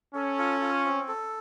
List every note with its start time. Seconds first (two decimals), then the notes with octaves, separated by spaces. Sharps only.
0.15 C#4 A4
0.38 F4
0.61 F4
0.85 C4
1.08 A4